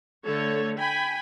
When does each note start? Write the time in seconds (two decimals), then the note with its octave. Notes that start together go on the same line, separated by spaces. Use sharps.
0.25 D3 A3 A4 C#5
0.78 G5 G#5 B5